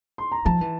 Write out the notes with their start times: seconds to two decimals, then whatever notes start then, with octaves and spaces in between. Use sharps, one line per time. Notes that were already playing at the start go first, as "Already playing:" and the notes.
0.18 C6
0.32 A#5
0.45 F3 A5
0.61 E3